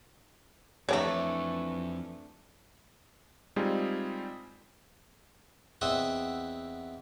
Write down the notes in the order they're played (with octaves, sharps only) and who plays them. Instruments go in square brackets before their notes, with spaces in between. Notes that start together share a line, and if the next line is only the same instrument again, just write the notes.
[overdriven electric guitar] F2 [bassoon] E3 [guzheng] A3 D4 [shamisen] C#5 D5 A#5
[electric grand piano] G3 G#3 C4 D#4 F4 G#4
[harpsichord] E2 C4 D#5 E5 F#5